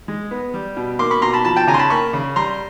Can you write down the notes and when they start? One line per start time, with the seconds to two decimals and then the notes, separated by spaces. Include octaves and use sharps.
0.08 G#3
0.31 B3
0.54 G3
0.77 B2
0.99 A#3 C6 D6
1.11 B5 C#6
1.22 B2 A#5 C6
1.33 A5 B5
1.45 F3 A5 B5
1.56 G5 A5
1.67 C#3 G#5 A#5
1.74 C6
1.79 A5 B5
1.90 A#3 B5 C#6
2.13 C#3
2.36 G3 A#5 C6